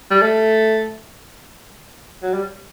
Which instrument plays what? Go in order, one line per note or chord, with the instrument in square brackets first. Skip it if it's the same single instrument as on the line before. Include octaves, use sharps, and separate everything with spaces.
[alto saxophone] G3
A3
F#3
G3